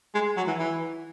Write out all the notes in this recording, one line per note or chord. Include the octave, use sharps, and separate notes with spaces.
G#3
F#3
E3
E3